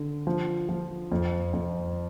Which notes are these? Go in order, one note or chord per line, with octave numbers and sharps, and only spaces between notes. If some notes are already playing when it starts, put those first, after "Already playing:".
Already playing: D3
F3
F3
F2
F2